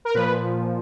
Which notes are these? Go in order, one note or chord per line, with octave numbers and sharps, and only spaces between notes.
A#4
A#2 F3 B4